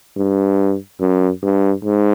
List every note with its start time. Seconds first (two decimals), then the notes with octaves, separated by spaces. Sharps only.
0.17 G2
1.00 F#2
1.43 G2
1.85 G#2